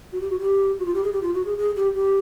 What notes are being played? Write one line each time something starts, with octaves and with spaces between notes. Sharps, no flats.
F#4
G4
F#4
G4
F#4
F4
G4
G#4
G4
F4
F#4
G#4
G#4
G4
G4